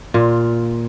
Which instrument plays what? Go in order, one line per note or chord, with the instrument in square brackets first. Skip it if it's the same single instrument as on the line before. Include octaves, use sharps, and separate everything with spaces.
[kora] A#2 F4